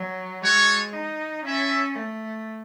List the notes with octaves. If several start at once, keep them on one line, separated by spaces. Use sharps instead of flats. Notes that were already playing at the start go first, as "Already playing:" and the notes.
Already playing: F#3
G#3 F#4 A4 C#5
D#4
C#4 E4 A4 E5
A3